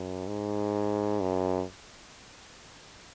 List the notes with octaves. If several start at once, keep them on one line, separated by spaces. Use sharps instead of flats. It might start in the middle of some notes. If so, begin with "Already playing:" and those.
Already playing: F#2
G#2
F#2